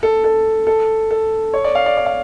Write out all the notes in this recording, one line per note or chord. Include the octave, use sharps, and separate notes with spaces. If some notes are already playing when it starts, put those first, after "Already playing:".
A4
A4
A4
A4
C#5
D5
F5
D5
D5
F5